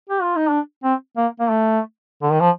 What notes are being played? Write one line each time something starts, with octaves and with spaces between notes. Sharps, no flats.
G4
F4
D#4
D4
C4
A#3
A#3
A3
D3
D#3
F3